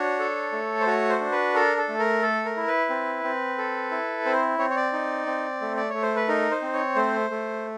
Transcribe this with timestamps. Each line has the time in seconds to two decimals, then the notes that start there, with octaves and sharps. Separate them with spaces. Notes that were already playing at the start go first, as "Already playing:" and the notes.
Already playing: D4 F#4 C#5
0.19 A4
0.52 A3
0.81 C5
0.87 F#4 C#5
1.10 C5
1.20 D4
1.32 B4
1.55 A4 A#4
1.77 A4
1.89 A3
1.99 A#4
2.22 A4
2.45 A#4
2.57 E4
2.67 B4
2.90 C4
3.24 C4
3.58 A4
3.91 E4
4.25 C4 C5
4.59 C4 C#5
4.70 C#5
4.76 D5
4.93 D#4
5.27 C4
5.61 A3
5.77 D5
5.90 A3 C#5
6.02 C5
6.16 B4
6.28 D#4 A#4
6.51 C5
6.62 C4
6.73 C#5
6.95 A3 C5
7.30 A3